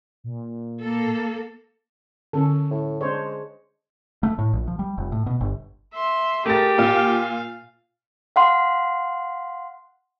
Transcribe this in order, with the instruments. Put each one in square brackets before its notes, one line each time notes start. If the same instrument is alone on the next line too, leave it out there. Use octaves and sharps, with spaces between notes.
[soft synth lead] A#2
[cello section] A#3 A4
[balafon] D3 [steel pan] C#4 A4
[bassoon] A2
[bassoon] G#3 [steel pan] D4 C5 C#5
[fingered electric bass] A3
A2
A#1
F3
G3
F1
A2
B2
G1
[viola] E5 C6
[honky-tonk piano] A3 A6 [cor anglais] G4 [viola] G#4 A#4
[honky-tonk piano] A#2 F4 [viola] F5
[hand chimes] F5 F#5 C6